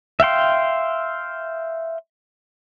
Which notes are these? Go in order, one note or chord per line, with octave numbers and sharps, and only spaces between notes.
E5 F5 G5 C6